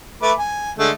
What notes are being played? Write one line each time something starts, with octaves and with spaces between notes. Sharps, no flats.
A3 B4 D6
G#5
D3 G#3 A3